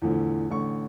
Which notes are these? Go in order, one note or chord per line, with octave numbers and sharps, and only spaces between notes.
E2 A2 D3 F3
A1 D3 C#6